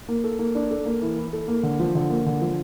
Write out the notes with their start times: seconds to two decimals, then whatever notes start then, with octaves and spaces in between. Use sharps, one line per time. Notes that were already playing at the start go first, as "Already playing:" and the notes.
0.08 A#3
0.24 A4
0.39 A#3
0.55 D4
0.71 A4
0.85 A#3
1.02 E3
1.17 E4
1.33 A4
1.48 A#3
1.63 D3
1.80 F3
1.95 D3
2.10 A#3
2.26 D3
2.42 F3